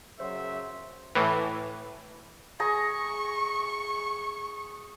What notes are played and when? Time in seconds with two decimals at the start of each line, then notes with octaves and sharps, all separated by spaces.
0.20 F#2 C#3 F#3 C5 E5 C6
1.15 A2 E3
2.60 G#4 A#5 C#6